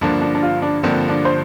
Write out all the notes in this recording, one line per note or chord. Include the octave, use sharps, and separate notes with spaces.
G2 D3 F3 A#3 D4
D4
D4
F4
D4
G2 D3 F3 A#3 C4
D4
C5